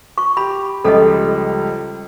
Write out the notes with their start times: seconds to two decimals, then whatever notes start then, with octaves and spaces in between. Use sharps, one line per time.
0.18 C#6
0.37 G4 B5
0.84 C#2 F3 G3 A4 D#5